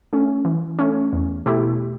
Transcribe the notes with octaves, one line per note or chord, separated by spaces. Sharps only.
A3 C#4
E3
A3 C#4
E2
B2 A3 E4 G4